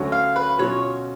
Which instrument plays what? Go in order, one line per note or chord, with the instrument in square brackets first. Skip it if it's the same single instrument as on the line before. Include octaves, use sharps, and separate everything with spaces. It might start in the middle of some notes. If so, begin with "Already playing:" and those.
Already playing: [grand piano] D2 D3 F#3 C#4 F#4
[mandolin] F5
B4
[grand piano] B2 F#3 C#4 F4 [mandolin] C#5